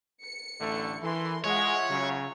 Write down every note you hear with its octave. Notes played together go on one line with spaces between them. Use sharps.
C#7
A1 D3 A3
E3 A4 A#4 C6
G#3 F4 C#5 E5 F#5
C#3 F#3